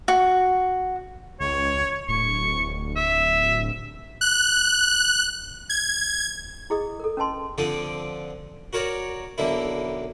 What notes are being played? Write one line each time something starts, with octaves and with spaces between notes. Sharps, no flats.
F#4
C#2 C#5
D1 C#6
E5
F#6
G#6
E4 G#4 D#5 D#6
A4 A#4
C#4 B4 D#5 A5 C6
D3 F3 C4 D5 D#6
F#4 A#4 C#5 D5
B1 D3 A#3 E4